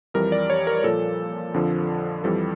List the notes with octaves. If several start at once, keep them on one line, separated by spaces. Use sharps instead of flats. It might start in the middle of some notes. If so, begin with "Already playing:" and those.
F2 E3 G3 A#4
D5
C#5
A#4
A#2 F3 A4
F2 D3 F3
F2 E3 G3 A4